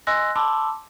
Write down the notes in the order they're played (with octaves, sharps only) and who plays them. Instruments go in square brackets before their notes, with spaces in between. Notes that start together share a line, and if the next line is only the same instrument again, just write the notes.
[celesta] D#5 G#5 C6 E6 F#6 A#6
A5 B5 C6 D6 E6